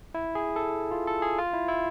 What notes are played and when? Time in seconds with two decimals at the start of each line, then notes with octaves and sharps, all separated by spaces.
0.15 E4
0.35 G#4
0.56 A4
0.91 F4
1.07 A4
1.22 G#4
1.38 F4
1.53 E4
1.68 E4